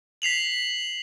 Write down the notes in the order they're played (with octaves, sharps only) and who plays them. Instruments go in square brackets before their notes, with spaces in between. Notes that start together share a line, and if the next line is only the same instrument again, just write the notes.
[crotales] B6 C7 F7 F#7